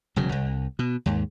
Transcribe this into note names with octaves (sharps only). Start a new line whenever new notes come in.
E1 C#3 F#3
C2
B2
D#2 G#2